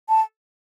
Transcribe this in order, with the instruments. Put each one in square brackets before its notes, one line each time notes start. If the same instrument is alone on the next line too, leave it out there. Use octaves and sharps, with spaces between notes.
[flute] A5